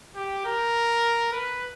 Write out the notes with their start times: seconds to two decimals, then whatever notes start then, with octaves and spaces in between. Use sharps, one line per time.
0.15 G4
0.45 A#4
1.32 B4